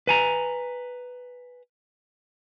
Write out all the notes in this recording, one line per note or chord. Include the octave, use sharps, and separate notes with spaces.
B4 G#5 A#5